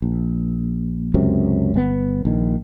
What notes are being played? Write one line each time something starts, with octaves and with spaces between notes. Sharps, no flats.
A#1
C#2 F#2 C3
G1 C3 B3
A#1 D#3